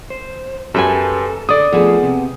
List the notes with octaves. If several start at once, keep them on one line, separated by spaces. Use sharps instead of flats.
C5
F#2 G4 A4 B4 G#5
D3 D5 D#6
F3 A3 B3 G#4
C3